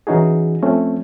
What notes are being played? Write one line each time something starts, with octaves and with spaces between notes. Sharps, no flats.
E3 C#4 D#4 F#4 G#4
F3 A3 C4 C#4